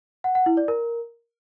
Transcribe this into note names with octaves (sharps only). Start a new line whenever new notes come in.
F#5
F#5
E4
D5
A#4